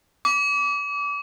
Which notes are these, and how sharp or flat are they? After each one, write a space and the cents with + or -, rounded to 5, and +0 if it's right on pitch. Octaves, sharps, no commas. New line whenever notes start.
D6 -30